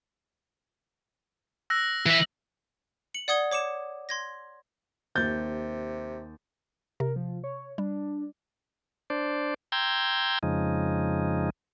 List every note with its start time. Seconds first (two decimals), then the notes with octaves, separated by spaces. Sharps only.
1.70 E6 F#6 A#6
2.06 E3 E5
3.14 C#7 F#7
3.28 D5 F#5 D#6 G#6 G7
3.51 C#5 D6 C#7 E7
4.09 C6 G#6 A#6
5.16 D#2 C3 G6 A6
7.00 C3 A#4
7.16 F3
7.44 C#5
7.78 G3 D4
9.10 D4 C5 D5
9.72 G5 A#5 C6 E6 G6 G#6
10.43 F2 C#3 F3 G#3 D#4